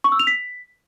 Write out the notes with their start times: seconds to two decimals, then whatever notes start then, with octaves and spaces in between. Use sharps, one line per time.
0.04 C#6
0.12 E6
0.20 F7
0.27 B6